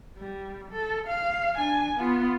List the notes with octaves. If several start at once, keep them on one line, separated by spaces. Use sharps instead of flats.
G3
A4
F5
D4 G#5
B3 F4